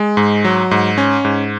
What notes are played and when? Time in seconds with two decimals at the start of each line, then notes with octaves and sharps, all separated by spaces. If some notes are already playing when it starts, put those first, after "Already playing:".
Already playing: G#3
0.17 G#2
0.44 F#3
0.71 G#2
0.98 C#4
1.25 G#2